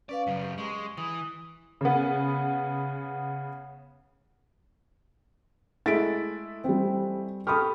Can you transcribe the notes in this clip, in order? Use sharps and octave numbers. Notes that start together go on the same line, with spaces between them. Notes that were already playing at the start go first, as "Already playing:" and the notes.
C#4 B4 D5 F5
F#2 C#3 B4
G4
G#3 C#6
E3 D#6
C#3 B3
G#3 A3 E4 A6 B6 D7
G3 C4
G4 A4 B5 C#6 D#6 F6